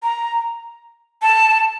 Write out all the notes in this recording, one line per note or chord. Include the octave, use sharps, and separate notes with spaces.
A#5
A5